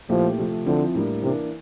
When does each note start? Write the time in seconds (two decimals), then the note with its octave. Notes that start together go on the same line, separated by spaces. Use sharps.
0.10 A#2 F3 A3 E4 G4
0.38 C3 F3 A3 C4
0.66 D3 F3 C4 E4
0.95 A2 G3 A#3 D4
1.23 C3 E3 A#3 D4